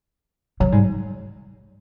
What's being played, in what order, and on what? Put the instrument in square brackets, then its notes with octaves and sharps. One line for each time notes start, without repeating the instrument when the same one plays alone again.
[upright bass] C#3 [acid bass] F#3
[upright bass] G#2 [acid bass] G3
[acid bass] F#3